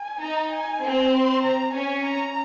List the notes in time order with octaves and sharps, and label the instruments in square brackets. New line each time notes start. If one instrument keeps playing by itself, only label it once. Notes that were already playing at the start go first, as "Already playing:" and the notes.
Already playing: [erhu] G#5
[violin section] D#4 [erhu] A#5
[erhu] G#5
[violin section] C4
[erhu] C6
A#5
[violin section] C#4 [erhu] G#5
[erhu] A#5